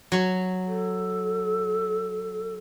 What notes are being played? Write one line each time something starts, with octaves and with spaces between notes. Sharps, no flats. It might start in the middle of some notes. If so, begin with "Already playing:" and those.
F#3 C#5
A4